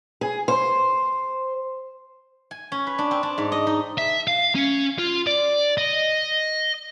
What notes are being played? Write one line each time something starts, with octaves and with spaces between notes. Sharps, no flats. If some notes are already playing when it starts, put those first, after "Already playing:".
G#4
C5
G#5
C#4
B4
D4
C4
D4
G#2
D#5
D#4
E5
F5
C#4
F4
D5
D#5